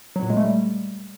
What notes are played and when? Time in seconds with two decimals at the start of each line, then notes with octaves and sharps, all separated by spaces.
0.16 F#3
0.23 A#2
0.30 G#3
0.37 A3
0.44 G3